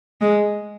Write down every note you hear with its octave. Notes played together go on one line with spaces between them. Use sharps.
G#3